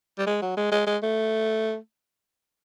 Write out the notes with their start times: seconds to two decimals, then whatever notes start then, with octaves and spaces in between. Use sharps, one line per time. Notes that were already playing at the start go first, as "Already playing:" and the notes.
0.18 G3
0.26 G#3
0.42 F#3
0.57 G#3
0.71 G#3
0.86 G#3
1.02 A3